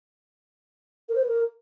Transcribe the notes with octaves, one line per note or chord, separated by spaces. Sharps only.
A#4
C5
B4
A#4